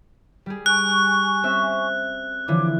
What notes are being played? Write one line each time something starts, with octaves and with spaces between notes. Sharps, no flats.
G3 G4 G#4
G#5 C#6 F#6
C4 C#4 E5
D3 E3 F3 C#5 D6